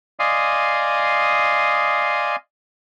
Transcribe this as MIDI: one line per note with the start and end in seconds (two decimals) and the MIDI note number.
0.20 2.36 74
0.20 2.36 75
0.20 2.36 77
0.20 2.36 80
0.20 2.36 84
0.20 2.36 87